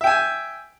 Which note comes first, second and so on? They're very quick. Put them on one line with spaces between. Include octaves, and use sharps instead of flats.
E5 G5 G#5